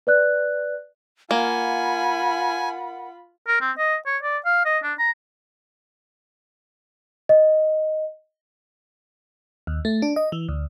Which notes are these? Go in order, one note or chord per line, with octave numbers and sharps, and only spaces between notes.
B4 D5 F#6
A#3 F4 F#5 G#5 B5
A#4
C4
D#5
C#5
D5
F5
D#5
D4
A#5
D#5
D#2
A3
D4
D#5
E3
D2